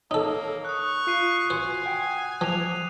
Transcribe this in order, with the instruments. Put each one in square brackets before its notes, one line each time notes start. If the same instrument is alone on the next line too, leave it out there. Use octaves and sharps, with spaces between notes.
[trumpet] A#3 [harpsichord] D#4 A4 [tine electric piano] C#5
[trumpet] C#6 [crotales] D#6 F#6
[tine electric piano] F4 [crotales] F#6 C7 D#7
[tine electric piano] F#4 [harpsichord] C5 [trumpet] G#5
[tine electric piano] F#5 G5
[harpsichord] F3 [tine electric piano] D6 [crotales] D#7 F7